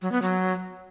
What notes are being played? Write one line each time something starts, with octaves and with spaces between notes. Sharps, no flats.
F#3
B3
F#3